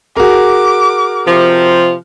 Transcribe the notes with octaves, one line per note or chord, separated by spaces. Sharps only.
F#4 G#4 A#4 D6
C3 F3